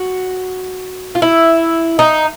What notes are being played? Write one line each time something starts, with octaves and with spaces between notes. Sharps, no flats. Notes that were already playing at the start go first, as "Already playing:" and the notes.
Already playing: F#4
F4
E4
D#4